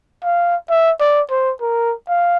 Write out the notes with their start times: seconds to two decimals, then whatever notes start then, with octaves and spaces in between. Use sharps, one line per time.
0.24 F5
0.70 E5
1.00 D5
1.30 C5
1.61 A#4
2.08 F5